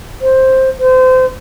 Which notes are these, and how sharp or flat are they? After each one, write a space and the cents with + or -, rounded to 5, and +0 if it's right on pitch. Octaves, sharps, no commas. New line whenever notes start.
C5 +10
C5 -30